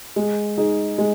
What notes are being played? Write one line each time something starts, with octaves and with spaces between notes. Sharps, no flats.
G#3
D#4 G#4
G#3